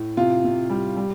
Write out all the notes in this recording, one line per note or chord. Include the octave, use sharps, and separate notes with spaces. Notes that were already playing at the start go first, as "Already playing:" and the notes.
Already playing: A2
C3 F4
C3
G3
G3